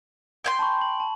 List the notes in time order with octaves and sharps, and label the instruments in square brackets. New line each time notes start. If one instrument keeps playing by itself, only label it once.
[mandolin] G5 G#5 C6
[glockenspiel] A5 B5 C#6
F#7
A5